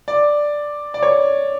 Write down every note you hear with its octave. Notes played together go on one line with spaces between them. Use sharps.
D5
D5
C#5